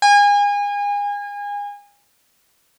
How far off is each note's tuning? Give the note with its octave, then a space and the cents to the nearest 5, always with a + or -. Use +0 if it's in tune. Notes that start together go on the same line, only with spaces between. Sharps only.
G#5 -30